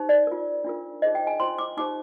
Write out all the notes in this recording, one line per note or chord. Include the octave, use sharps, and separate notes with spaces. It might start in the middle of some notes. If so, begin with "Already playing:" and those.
Already playing: D#4 G4 C5
D5
F4 A#4
D4 F4 A#4
D#4 G#4 C5 D#5
G5
G#5
F4 C5 C6
D6
D#4 G4 C5 D6